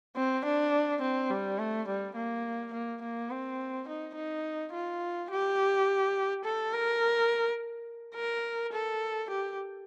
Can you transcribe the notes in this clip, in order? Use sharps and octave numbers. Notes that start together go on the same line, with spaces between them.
C4
D4
C4
G3
A3
G3
A#3
A#3
A#3
C4
D#4
D#4
F4
G4
A4
A#4
A#4
A4
G4